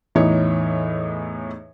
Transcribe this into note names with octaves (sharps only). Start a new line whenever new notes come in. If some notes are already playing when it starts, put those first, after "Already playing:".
E2 A2 E3 D#4 C#5